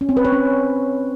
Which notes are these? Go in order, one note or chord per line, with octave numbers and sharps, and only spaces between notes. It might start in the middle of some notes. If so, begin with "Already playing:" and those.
C#4
C4
B4
C#5
C#4